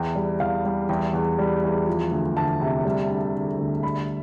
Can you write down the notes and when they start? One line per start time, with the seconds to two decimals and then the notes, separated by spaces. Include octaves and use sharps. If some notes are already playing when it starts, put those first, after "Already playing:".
Already playing: E2 G5
0.16 G3
0.40 E2 F5
0.65 G3
0.89 E2 G5
1.13 E2
1.39 G3
1.63 E2
1.87 F3
2.11 D2
2.36 D2 A5
2.61 C3
2.85 G3
3.10 D3
3.35 D3
3.59 D2
3.83 G3 B5